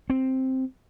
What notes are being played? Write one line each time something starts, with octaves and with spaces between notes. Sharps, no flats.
C4